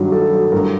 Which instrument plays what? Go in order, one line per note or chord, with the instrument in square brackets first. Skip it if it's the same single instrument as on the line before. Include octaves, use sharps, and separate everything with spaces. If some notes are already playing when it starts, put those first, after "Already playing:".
Already playing: [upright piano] G2 D#3 F#3
F#3 A4
F#3
G2 A#4